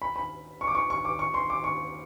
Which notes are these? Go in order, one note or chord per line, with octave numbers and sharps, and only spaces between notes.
B5
B5
C#6
D6
C#6
C#6
D6
C#6
C6
D6
C#6